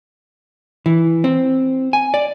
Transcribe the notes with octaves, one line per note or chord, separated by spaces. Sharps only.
E3
C4
G#5
D5